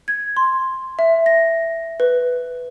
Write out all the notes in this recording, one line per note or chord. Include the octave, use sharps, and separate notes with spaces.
G#6
C6
E5
A#6
B4